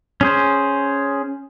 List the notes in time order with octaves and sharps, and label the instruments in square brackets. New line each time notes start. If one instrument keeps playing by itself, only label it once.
[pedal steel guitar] C#4 G#4 C5